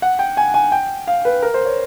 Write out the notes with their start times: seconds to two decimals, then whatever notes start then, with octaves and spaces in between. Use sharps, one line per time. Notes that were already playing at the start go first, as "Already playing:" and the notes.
0.02 F#5
0.19 G5
0.37 G#5
0.54 G#5
0.72 G5
1.07 F5
1.25 B4
1.43 A#4
1.54 C5
1.66 C#5